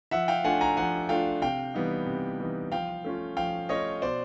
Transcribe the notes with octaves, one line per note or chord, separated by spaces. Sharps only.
F3 E5 F#5
F5 G5
A3 D4 F4 F#5 G#5
G#5 A#5
F3 F#5 G#5
A3 D4 F4 F5 G5
C3 F5 G5
E3 G3 B3 D#4
C3
E3 G3 B3 D#4
F3 F5 G5
A3 C#4 F4
F3 F5 G5
A3 C#4 F4 C#5 D#5
B2 C5 D5